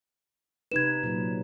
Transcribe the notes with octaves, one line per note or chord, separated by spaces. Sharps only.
C3 D#4 B4 G#6 E7
A#2 F#3